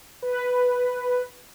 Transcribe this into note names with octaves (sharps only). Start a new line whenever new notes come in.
B4